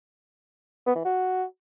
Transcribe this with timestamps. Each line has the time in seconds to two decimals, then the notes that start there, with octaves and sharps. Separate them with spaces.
0.87 B3
0.96 E3
1.05 F#4